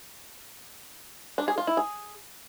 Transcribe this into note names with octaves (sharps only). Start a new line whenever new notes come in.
D4
G#4
F4
E4
G#4